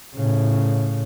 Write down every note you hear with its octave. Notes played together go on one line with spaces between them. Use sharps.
A2 C#3